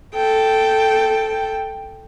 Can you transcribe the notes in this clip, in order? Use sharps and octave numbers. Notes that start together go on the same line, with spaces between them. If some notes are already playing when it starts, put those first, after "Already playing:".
A4 G5